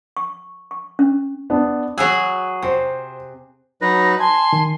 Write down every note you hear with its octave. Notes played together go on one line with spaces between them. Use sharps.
C#6
C#6
C#4
B3 D4
F#3 G#4 G#5 E6 F#6
C3 C5
F#3 D#4 B4 A#6
G#5 A5 C6
D#3